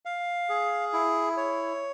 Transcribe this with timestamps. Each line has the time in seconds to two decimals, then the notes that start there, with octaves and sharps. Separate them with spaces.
0.05 F5
0.49 G#4
0.93 E4
1.37 C#5